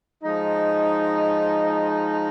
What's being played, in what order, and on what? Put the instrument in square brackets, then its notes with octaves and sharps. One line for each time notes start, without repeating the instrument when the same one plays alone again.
[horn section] F3 G#3 D#4